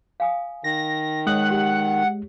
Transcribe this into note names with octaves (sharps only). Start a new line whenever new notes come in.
F5 G#5 D#6
D#3 A#6
G#3 C#5 F#5 D#6
G4